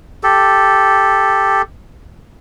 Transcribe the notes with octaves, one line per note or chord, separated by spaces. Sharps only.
G4 A4